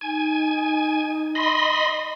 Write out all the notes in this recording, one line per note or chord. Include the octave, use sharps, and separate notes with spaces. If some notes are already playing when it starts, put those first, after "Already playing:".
D#4 G#5
D#5 B5 C6